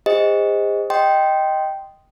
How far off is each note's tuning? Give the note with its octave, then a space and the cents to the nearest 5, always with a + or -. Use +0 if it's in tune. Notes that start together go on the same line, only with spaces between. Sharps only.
G#4 -40 C5 +0 D#5 +10
D#5 +0 G5 -10 C6 +0